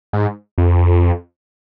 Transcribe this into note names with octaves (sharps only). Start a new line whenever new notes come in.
G#2
F2